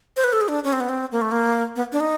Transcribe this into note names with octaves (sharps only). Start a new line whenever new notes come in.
C5
B4
A4
G#4
D4
C#4
C4
B3
C4
A#3
A3
A#3
B3
D4
D#4